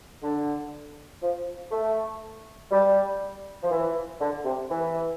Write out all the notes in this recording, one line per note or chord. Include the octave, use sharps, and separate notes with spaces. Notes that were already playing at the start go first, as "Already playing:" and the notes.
D3
F3
A3
G3
F3
E3
D3
C3
E3